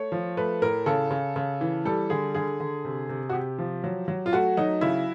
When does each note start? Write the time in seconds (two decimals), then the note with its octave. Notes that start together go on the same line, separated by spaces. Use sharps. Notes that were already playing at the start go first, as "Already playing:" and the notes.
Already playing: A3 C#5
0.12 F3
0.37 A3 B4
0.62 A2 A#4
0.86 C#3 A4
1.11 C#3
1.36 C#3
1.61 E3
1.85 G3 A4
2.10 D3 G#4
2.35 D3 G#4
2.60 D3
2.85 C3
3.09 C3
3.30 F#4
3.33 C3 G4
3.58 F3
3.84 F#3
4.08 F#3
4.26 F4
4.33 A3 F#4
4.57 F#3 D#4
4.81 C#3 E4